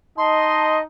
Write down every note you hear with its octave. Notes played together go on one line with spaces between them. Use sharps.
D#4 D#5 A5 C6